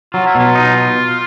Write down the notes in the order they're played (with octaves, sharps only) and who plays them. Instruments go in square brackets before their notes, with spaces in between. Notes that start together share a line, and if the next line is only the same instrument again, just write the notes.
[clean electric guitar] F#3 [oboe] F4
[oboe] E4
[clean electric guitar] B2 [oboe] F4
[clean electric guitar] D#4